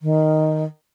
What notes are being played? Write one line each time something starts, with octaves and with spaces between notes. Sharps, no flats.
D#3